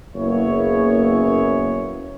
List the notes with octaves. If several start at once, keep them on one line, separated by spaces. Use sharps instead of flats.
F#1 C#3 A#3 B3 E4 C#5